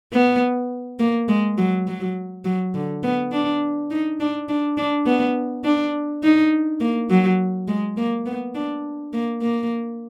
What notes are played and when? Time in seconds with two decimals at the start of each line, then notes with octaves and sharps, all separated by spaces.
0.13 B3
1.00 A#3
1.28 G#3
1.58 F#3
1.87 F#3
2.45 F#3
2.74 D3
3.03 B3
3.32 D4
3.91 D#4
4.20 D4
4.48 D4
4.78 D4
5.06 B3
5.64 D4
6.23 D#4
6.80 A#3
7.10 F#3
7.68 G#3
7.97 A#3
8.26 B3
8.55 D4
9.13 A#3
9.42 A#3